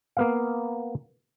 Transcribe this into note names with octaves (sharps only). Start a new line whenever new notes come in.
A#3 B3 F5